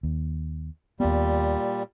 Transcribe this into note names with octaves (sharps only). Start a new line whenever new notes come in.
D#2
D#2 A#2 G3 B3